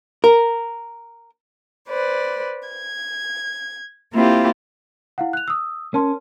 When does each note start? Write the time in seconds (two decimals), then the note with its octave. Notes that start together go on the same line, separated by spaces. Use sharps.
0.24 A#4
1.88 B4 C5 D5
2.68 G#6
4.13 A#3 C4 E4 F4 G4
5.18 E4 F5 F#5
5.33 F#6 F7
5.48 D#6 E6
5.94 C#4 A#4 A5 C6